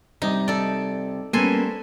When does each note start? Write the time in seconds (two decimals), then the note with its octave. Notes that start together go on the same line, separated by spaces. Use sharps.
0.22 C3 G3 D#4
0.48 A4 D5
1.33 G3 A#3 B3 C#4 A4 C5 G#5